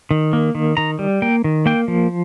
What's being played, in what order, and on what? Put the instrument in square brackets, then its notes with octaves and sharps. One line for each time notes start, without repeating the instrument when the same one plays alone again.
[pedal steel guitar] D#3
A#3
D#3
D#3 A#5
G3
A#3 G5
D#3
A#3 G5
F3